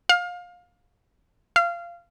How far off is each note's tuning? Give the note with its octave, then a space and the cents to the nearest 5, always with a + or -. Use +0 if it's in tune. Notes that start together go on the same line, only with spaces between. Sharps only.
F5 +25
F5 -20